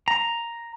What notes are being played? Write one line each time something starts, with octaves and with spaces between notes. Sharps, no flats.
A#5